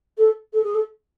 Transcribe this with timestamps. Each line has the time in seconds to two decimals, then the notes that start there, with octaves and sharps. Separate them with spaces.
0.18 A4
0.54 A4
0.64 G#4
0.75 A4